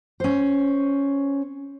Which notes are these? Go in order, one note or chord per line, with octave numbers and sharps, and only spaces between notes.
C#4 C5